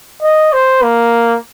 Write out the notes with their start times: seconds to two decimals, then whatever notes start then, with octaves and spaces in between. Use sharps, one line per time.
0.22 D#5
0.53 C5
0.83 A#3